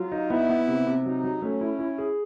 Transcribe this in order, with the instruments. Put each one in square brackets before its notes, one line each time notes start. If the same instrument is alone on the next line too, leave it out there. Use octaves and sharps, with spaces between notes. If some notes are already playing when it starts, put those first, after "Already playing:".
Already playing: [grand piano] F#3 [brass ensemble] F4
[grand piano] D#4
[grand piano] B3 [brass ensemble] E4
[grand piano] B3
C3
C3
[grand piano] F#3 [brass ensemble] D#4
[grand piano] F#3
[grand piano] A3 [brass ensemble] C#4
[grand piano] E4
E4
G#4